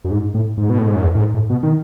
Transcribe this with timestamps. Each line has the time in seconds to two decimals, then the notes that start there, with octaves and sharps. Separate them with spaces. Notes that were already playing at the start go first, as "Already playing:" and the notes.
0.04 F#2
0.11 G#2
0.34 A2
0.57 G#2
0.70 B2
0.79 A2
0.87 G#2
0.95 F#2
1.04 E2
1.15 A2
1.19 G#2
1.34 A2
1.50 B2
1.63 D#3